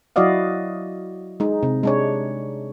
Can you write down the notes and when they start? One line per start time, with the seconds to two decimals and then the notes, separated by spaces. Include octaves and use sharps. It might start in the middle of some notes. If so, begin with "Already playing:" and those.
0.16 F#3 E4 F#4 D5 D#5 F5
1.40 G#3 D#4
1.63 C3
1.83 G#3 D4 C#5